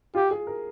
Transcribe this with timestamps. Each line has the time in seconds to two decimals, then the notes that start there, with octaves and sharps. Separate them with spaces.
0.15 F4 G4
0.31 G#4
0.47 A#4